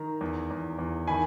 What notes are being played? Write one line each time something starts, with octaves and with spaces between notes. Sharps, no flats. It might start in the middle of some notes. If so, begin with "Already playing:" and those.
Already playing: D#3 A#5
E2
E2
E2
D#3 G#5 B5